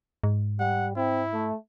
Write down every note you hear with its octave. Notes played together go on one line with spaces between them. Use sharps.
G#2
G3 F#5
C4 E4
A3